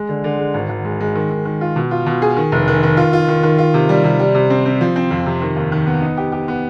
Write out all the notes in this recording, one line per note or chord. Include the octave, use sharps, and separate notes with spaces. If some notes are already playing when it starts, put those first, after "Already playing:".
Already playing: G#3
D3
D3
G#3
G#1
G#1
G#3
G#3
D#3
D#3
D#3
F4
B2
F4
B2
G#4
D#3
F1
D#3
D#3
F4
F4
D#3
D#3
F4
C3
G3
C3
G3
C3
C4
C4
F3
C4
F2
C3
D#3
D#2
D#3
B3
D#4
G4
G4
B3